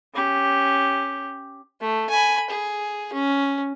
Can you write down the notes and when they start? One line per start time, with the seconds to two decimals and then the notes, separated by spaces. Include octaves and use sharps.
0.15 C#4 G4
1.81 A3
2.09 G#5 B5
2.50 G#4
3.13 C#4